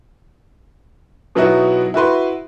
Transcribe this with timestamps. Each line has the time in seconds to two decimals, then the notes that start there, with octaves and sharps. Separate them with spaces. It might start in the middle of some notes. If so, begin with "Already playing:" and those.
1.35 B2 F#3 B3 D#4 E4 F#4
1.94 E4 F#4 B4 C6